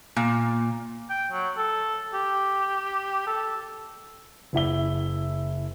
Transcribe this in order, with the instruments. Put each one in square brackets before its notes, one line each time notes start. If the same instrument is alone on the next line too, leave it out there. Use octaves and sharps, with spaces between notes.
[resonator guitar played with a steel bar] A#2
[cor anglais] G5
F#3
A4
G4
A4
[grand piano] F#1 E4 E5 G7